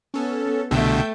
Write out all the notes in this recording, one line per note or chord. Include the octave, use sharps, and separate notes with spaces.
B3 C#4 A4
C2 B2 D3 A3 E5 G5 G6